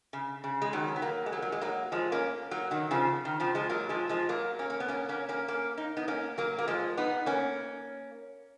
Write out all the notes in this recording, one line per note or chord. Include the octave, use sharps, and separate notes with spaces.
C#3
C#3
G#3
D#3 F#3
C#4
B3
F#3 A#3
G#3
F#3 A#3
F#3
G#3
F#3 A#3
F3 G#3
A#3 C#4
F#3 A#3
D#3 F#3
C#3 F3
D#3
C#3 F3
F3 G#3
F#3 A#3
F3 G#3
F3 G#3
F#3 A#3
A#3 C#4
A#3
B3
A#3 C#4
A#3 C#4
A#3 C#4
A#3 C#4
D#4
B3 D#4
A#3 C#4
F#3 A#3
A#3
F3 G#3
B3 D#4
A#3 C#4